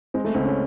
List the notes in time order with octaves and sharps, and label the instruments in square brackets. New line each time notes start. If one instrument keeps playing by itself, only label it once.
[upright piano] G#3 [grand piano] C4
[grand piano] A3
[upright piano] C#2 [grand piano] C4
[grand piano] C#4